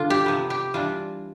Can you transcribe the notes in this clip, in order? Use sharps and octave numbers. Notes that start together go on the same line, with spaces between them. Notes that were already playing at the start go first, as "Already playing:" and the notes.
Already playing: D3 D4 F4
G4
C3 F3 B3
G4
E3 G3 D4 F4